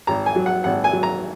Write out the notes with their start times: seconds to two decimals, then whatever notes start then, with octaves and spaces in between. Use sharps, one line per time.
0.07 G#1 A#5
0.26 G#5
0.36 F#3
0.46 F#5
0.64 G#1 F#5
0.84 G#5
0.93 F#3
1.03 A#5